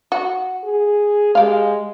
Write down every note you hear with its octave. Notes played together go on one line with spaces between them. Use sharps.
F#4
G#4
G#3 G4 F5